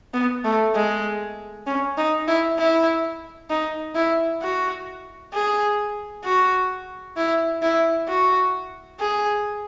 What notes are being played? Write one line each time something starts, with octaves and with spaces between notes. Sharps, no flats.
B3
A3
G#3
C#4
D#4
E4
E4
D#4
E4
F#4
G#4
F#4
E4
E4
F#4
G#4